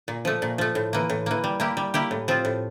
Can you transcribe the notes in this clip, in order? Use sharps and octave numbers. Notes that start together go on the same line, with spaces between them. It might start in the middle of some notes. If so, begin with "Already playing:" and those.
A#2
F3 A3
A#2
F3 A3
A2
E3 A#3
A2
E3 A#3
G3
A#3 E4 G4
G3
A#3 E4 G4
A2
F3 C4 F4
A2